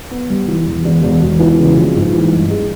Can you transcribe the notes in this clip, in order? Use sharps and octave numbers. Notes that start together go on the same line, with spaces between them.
B3
G3
E3
E1
E1
E1
E1
E3
C#3
A#1
G#2
E3
G2
G#3